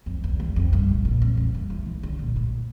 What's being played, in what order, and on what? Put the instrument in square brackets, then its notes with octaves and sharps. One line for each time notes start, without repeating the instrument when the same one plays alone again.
[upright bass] F2
E2
E2
F2
G2
A2
A#2
F2
F2
G2
E3
E3
D3
A#2
A2